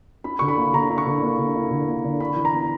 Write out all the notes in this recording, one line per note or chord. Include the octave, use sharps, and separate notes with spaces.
E4 B5
D3 C#6
B5
A#3
D3 A#5
E4
C#6
D3
A#3
D3
E4
D3
A#3
D3
D4 B5
E3
A#5
B3